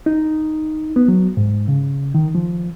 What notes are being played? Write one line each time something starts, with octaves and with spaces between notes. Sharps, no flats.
D#4
B3
F#3
G#2
C#3
D#3
F3